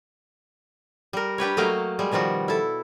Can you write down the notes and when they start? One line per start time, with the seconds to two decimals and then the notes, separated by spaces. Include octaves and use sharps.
1.13 G3 A#4
1.38 D4 G4 B4 C#5
1.57 F#3 A3 A#3 D#5 F5 G5
1.99 G3 G#3
2.12 B2 D#3 F3 G3 F#4
2.48 E4 A4